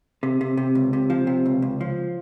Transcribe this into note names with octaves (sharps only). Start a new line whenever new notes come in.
C3
C3
C3
C#2
C3
F3
C3
C#2
C#2
F3